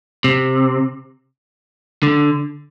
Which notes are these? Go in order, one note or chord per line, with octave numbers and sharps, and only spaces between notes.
C3
D3